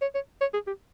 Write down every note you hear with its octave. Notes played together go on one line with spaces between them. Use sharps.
C#5
C#5
C#5
G#4
G4